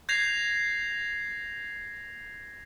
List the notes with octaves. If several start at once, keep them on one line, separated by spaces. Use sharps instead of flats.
G6 G#6 A#6 C7 F7